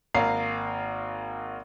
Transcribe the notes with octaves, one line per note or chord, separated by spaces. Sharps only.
G#1 A#3 F5 A#5 C7